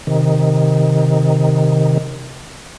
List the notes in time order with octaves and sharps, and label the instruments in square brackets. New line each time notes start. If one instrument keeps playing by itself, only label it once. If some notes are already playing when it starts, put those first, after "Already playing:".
[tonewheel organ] C3 D#3